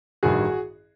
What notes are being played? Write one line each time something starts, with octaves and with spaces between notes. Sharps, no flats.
A1 G2 D#3 F#4 G#4